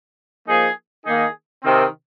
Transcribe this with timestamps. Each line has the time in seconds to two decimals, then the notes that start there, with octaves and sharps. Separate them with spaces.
0.48 F3 A#3 D#4 G#4
1.06 D#3 A#3 D#4 G#4
1.64 C3 D#3 C4